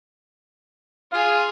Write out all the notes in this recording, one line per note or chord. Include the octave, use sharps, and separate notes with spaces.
F4 G#4 F5